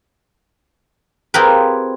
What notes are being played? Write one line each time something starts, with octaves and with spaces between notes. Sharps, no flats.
C4 F4 G4 G#4 A#4 B4